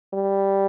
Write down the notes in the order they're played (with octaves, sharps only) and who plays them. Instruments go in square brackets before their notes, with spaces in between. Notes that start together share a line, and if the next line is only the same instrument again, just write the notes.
[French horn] G3